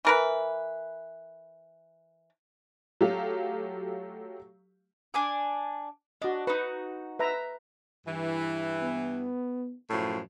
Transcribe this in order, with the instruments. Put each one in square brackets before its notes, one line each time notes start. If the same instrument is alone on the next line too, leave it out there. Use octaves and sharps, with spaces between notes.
[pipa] E3 A#4 B4
[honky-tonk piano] F#3 A3 F4 G4 F5
[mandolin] D4 G#5 D6
[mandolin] D4 [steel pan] F#4 D#5
[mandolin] D#4 F#4 [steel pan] B4
[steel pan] B4 E5 A#5
[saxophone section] G2 E3
[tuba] B3
[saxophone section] F#2 A2 F3